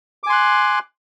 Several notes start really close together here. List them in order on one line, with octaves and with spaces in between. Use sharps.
D6 G#5 C6 F#6